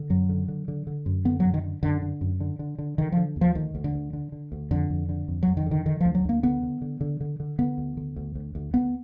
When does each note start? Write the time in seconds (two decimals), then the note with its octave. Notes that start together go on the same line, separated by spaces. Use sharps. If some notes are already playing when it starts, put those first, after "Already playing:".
Already playing: D3
0.10 F#2 F#3
0.29 D3
0.48 D3
0.68 D3
0.87 D3
1.06 F#2
1.25 D3 B3
1.40 F#2 F#3
1.54 D#3
1.63 D3
1.83 F#2 D3
2.02 D3
2.21 F#2
2.40 D3
2.59 D3
2.78 D3
2.98 D3 D#3
3.12 D3 F3
3.36 D#2
3.41 F3
3.55 D2 D#3
3.75 D2
3.84 D3
3.94 D2
4.13 D3
4.32 D3
4.52 D2
4.71 F2 D3
4.90 F2
5.09 D3
5.28 F2
5.43 F2 F#3
5.57 D#3
5.66 D3
5.71 D#3
5.86 D3 D#3
6.00 D2 F3
6.15 F#3
6.25 D2 A#3
6.43 D3 B3
6.63 D3
6.82 D3
7.01 D3
7.20 D3
7.40 D3
7.58 D3 B3
7.78 D2
7.97 D3
8.16 D2
8.35 D2
8.55 D2
8.74 D2 B3